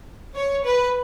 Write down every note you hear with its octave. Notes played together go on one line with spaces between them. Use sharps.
C#5
B4